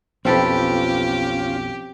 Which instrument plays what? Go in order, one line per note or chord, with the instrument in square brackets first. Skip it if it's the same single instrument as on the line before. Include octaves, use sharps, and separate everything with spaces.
[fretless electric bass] B1 F2 [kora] C4 A4 B4 [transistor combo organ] C#4 F4 [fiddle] G4